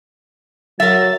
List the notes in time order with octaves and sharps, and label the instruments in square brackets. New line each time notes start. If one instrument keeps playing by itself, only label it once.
[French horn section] F#3 [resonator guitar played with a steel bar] A#4 E5 [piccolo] A6